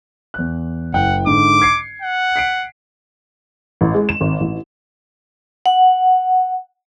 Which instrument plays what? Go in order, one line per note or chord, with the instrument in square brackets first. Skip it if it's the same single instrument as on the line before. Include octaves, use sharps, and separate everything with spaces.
[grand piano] E2 F#6
[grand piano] F#1 E4 G5 [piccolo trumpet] F#5
[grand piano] G#2 D3 [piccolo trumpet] D6
[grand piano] G#6 C7 C#7
[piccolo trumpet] F#5
[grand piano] B6 C7 D7
[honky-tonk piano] A1
G#3
E7
G#1
A1
[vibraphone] F#5